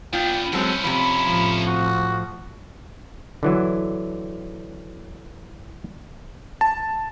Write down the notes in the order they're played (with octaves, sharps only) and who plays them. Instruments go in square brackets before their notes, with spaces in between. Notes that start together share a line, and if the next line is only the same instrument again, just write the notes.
[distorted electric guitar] B3 D4 [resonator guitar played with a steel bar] F4 [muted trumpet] G5
[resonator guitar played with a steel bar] F#3 G#3 C4 [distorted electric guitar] C#4 E4 [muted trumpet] A4
[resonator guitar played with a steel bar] F2 C3 [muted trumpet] B5
[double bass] A2 F3
[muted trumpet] F#4
[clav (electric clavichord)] D3 E3 F#3
[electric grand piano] A5